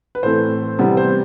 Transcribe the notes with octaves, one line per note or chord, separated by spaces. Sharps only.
B4
A2 E3 A3 C4 C5
C3 E3 G3 B3
C5